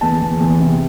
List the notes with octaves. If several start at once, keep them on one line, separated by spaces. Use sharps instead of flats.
E2 A5
E2
E2
C3